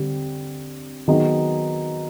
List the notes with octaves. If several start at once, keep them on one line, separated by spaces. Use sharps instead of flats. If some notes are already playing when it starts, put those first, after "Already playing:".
Already playing: D3 G3 C4
D#3 F#3 B3 D#4 G#4